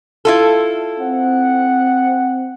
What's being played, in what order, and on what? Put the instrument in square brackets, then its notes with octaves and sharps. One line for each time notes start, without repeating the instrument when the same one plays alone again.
[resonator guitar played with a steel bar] E4 F4 A4
[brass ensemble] C4 F#5